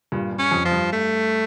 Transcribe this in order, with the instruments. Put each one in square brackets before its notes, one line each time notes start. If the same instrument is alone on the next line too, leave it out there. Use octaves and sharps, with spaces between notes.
[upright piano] G2 A#2
G2
[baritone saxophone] C#4
[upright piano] F2
[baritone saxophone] F3
[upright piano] G2
[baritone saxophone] A3